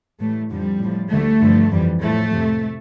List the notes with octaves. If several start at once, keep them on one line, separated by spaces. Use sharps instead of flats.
A2 E3 G3 A3
F2 D3 F3 G3
A2 F3
D2 D3 G3 A3
G2 D3 F3
F2 E3 G3
A2 F3 A3
F2 C3 F3